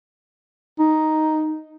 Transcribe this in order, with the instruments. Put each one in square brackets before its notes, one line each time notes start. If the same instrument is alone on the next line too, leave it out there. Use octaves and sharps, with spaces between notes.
[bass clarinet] D#4